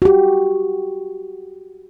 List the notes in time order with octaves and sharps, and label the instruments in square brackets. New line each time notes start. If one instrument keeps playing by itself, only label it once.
[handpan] F#4 G4